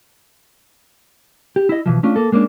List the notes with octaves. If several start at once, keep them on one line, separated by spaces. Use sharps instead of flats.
G4
E4 D#5
B2 E3 F3
A3 C#4 D4 F4
A#3 A4
G#3 A#3 C#4 D4